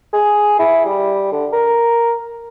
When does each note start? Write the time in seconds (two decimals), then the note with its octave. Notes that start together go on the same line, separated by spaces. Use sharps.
0.13 G#4
0.59 E4
0.85 G3
1.32 D3
1.53 A#4